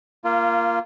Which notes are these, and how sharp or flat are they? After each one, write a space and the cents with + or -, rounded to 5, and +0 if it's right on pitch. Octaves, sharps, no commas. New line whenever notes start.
A#3 +0 F4 -20